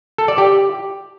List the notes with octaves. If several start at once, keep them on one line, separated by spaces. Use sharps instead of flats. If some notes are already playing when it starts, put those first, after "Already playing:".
A4
D5
G4